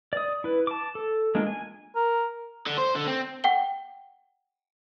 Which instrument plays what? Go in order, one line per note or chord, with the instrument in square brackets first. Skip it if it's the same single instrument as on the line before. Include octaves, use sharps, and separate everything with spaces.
[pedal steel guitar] D5 D#6
E4 B4
A5 D6
A4
G#3 A#3 D4 F4
G#5
[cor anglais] A#4
[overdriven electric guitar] D3
C5
D3
C4
[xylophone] F#5 G5 G7